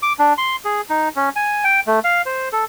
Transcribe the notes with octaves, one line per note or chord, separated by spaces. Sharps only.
D6
D4
C6
G#4
D#4
C#4
G#5
G5
A3
F5
C5
A4